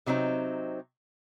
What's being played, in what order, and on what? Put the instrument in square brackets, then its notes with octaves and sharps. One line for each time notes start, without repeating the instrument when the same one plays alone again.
[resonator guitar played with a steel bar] C3 F#3 C4 D#4